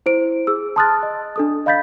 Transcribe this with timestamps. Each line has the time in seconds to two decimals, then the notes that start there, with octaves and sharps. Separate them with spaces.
0.06 E4 C5 D7
0.47 G#4 E6
0.76 A5 C6 D#6 F6 F#6 A6
1.03 D#5
1.36 D4 A4 D#6
1.66 D#5 F5 B5 G6 A6 B6